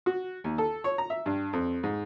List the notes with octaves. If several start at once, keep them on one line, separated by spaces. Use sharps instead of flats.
F#4
D#2
A4
C#5
A#5
E5
G2
F2
G#2